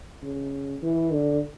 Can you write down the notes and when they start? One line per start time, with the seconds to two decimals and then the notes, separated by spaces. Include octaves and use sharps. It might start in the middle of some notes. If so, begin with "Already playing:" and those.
0.23 C#3
0.82 E3
1.12 D3